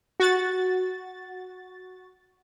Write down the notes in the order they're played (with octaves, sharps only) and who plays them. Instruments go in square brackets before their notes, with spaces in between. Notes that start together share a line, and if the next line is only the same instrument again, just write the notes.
[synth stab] F#4 A6